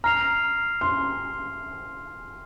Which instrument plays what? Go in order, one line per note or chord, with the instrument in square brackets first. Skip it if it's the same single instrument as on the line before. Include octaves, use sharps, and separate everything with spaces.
[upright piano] A#5 [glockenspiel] F6 C7 F7
[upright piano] C6